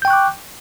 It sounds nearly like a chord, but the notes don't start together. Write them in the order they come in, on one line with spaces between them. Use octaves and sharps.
G6 G5 C#6 F#6 D6